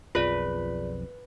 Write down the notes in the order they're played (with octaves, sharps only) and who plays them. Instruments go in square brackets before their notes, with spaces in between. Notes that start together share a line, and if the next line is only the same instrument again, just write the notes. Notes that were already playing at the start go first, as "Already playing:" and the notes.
[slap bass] B1 F2 F3 [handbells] F4 G#4 D5 [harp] B4